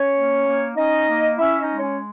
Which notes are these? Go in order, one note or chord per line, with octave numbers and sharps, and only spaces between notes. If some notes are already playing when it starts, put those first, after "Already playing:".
Already playing: C#4 C#5
A#3
A#3
C#4 D#4 D#5
A#3
C#4 E4 E5
D#4 D#5
G#3
C#4 C#5